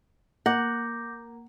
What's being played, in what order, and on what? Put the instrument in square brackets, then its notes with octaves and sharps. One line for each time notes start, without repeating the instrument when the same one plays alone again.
[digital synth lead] A#3 [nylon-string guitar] F#5 [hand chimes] D6 G6 A#6